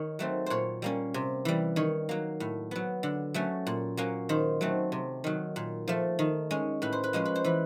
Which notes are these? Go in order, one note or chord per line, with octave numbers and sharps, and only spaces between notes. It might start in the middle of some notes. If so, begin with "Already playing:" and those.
Already playing: D#3 C#5
F#3 A3 C4
A#2 C5 C#5
G3 A#3 C#4
C3
E3 G3
D#3 C#5
F#3 A#3
A2
F#3 B3
D3
F#3 A3 C#4
A#2
F#3 A#3 C#4
D#3 C5
F#3 A3 C4
C3
D#3 F#3
A#2
F3 A3
D#3
G#3 C#4
A2 B4
C5
B4
F3 G#3 C#4 C5
B4
C5
E3 B4